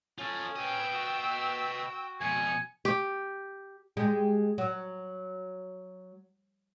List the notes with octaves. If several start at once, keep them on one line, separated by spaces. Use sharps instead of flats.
C#4 F4 A4
B4 D#5 G5 E6
F#4
F2 B2 G#5 C#7
G4
G#3 G4
F#3